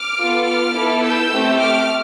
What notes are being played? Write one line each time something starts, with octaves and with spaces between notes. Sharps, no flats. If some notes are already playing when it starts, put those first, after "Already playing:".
Already playing: D6 F6
B3 F4 A4
D6 F6
B3 E4 A4
E6 G6
A3 C4 G4
D6 F6